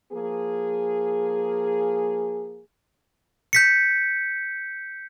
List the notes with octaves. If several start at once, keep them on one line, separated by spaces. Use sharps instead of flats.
F3 A#3 G#4
G6 B6 C#7